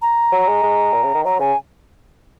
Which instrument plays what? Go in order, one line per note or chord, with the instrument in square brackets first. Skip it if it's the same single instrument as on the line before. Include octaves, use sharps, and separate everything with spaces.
[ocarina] A#5
[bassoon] F#3
G#3
G#3
A#2
C#3
D#3
[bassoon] F#3 [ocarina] A#5
[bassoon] C#3 [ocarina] G#5